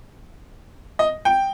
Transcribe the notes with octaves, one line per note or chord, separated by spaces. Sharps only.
D#5
G5